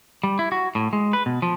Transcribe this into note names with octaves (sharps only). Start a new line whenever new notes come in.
G3
E4
F#4
A2
G#3
B4
B2
F3